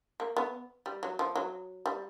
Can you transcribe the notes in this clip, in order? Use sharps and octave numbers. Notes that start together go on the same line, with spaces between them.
A#3
B3
G3
F#3
F3
F#3
G3